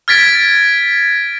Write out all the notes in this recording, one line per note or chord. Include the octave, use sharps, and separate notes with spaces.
F6 G#6 A6 B6 D7